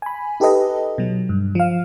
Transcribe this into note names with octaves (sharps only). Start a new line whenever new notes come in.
G#5 B5
D#4 G4 A4 B4 D#5
B2 F#3
G2
F3 F5